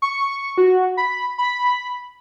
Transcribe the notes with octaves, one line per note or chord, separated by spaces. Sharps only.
C#6
F#4
B5
B5